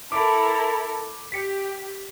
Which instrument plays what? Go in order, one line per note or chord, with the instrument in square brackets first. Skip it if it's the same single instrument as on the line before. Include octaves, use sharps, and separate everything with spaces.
[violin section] E4 A4 A#4 [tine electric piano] D6
[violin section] G4 [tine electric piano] B6 C#7